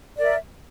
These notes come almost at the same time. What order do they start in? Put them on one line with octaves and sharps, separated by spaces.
D5 A#4 E5